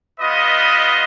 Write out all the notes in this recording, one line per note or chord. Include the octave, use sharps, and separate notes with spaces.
G3 B3 F4 B4 D#5